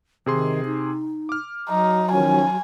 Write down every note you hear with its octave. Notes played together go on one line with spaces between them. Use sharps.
C3 D#3 G#4 C6
D#4
D6 F6
F#3 D#4
D#3 F3 C#4 G#5